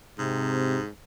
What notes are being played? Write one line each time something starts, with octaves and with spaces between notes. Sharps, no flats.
G#2 C3